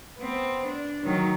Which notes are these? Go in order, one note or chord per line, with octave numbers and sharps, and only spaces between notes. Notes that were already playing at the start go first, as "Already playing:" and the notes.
B3 C4
D4
D#3 F#3